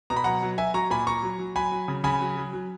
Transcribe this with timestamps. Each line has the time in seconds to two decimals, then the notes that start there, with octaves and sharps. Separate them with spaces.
0.10 B2 A#5
0.16 B5
0.24 F#3 F#5 A#5
0.43 F#3
0.58 F#3 E5 G#5
0.74 F#3 A#5 C#6
0.91 A#2 G#5 B5
1.07 A#2 A#5 C#6
1.23 F#3
1.39 F#3
1.55 F#3 G#5 B5
1.72 F#3
1.88 C#3
2.04 C#3 G#5 B5
2.21 F#3
2.37 F#3
2.53 F#3